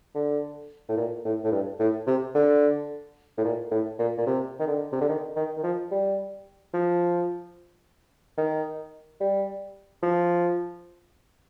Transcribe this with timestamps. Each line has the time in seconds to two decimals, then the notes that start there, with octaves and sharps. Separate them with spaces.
0.15 D3
0.89 A2
0.97 A#2
1.25 A2
1.44 A2
1.52 G2
1.79 A2
2.07 C3
2.35 D3
3.38 A2
3.44 A#2
3.71 A2
3.99 A#2
4.18 A#2
4.27 C3
4.60 D#3
4.67 D3
4.93 C3
5.01 D3
5.09 D#3
5.36 D#3
5.57 D#3
5.63 F3
5.91 G3
6.74 F3
8.38 D#3
9.21 G3
10.03 F3